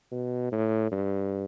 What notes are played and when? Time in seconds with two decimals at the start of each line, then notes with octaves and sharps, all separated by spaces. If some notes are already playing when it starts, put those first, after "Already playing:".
0.11 B2
0.52 A2
0.92 G2